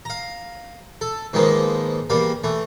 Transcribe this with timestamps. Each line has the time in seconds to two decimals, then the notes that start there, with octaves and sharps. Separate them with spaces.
0.05 F5 A#5
1.01 A4
1.33 G#2 D#3 F3 G#3 A#3 B3
2.10 E2 G3 A#3 F5
2.44 E3 A3